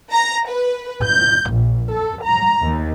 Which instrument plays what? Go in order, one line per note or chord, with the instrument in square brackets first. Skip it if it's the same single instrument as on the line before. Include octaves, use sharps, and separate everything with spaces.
[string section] A#5
B4
G6
A#1
A4
A#5
D#2